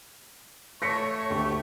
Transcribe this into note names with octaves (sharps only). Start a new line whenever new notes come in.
A3 C#5 A#6 B6 C#7
D2 G4 C#6